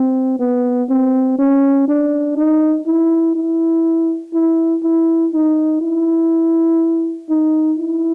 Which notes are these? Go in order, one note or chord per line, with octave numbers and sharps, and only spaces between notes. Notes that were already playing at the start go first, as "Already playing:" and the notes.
Already playing: C4
B3
C4
C#4
D4
D#4
E4
E4
E4
E4
D#4
E4
D#4
E4